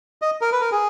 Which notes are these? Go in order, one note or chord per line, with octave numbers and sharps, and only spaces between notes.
D#5
A#4
B4
A#4
G#4